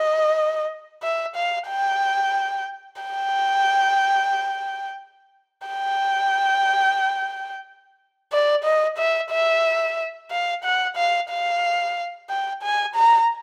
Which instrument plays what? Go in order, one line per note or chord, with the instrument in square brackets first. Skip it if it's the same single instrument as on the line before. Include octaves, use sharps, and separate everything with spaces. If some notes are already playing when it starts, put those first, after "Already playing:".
Already playing: [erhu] D#5
E5
F5
G5
G5
G5
D5
D#5
E5
E5
F5
F#5
F5
F5
G5
G#5
A#5